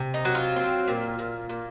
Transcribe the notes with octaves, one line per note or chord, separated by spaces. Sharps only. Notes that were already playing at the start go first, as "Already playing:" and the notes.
Already playing: C3
D#4
F#3
F4
C4
A#2
A#2
A#2